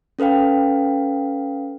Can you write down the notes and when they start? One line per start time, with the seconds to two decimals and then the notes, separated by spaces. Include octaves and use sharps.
0.19 C#4 A4 B4 F5 G5